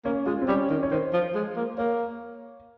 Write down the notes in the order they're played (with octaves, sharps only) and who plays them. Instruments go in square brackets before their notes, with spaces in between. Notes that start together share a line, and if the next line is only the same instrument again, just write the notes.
[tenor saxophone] A#3 [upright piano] C#4
[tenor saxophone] G#3 [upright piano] F4
[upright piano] C4
[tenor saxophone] G3 [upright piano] C#4
[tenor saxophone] D#3
[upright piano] C#5
[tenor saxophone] D#3 [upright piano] C5
[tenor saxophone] F3
G#3
A#3
[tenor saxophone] A#3 [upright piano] C#5